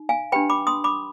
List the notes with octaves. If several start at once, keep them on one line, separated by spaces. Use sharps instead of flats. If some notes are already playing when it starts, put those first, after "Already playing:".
Already playing: D#4
F5 G#5
D4 G4 B4 G5 B5
B5 D6
C6 D#6
B5 D6